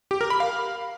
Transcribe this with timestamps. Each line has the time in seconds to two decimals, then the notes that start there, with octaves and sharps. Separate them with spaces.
0.11 G4
0.21 A#4
0.30 B5
0.40 F5